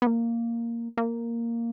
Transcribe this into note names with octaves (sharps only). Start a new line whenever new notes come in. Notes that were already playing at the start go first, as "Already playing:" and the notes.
B3
A#3
A#3